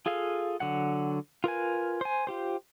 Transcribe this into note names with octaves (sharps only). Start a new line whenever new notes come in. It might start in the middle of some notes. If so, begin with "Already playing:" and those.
F4 G#4 A4 F5
D3 F#3 F#5
F4 A#4 B4 G#5
C5 G#5
F4 G4 C5